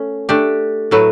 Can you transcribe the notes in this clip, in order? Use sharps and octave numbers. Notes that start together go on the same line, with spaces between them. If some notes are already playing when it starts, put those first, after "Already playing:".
Already playing: A3 C#4
A3 D4 G4
A2 F#3 A3 E4 B4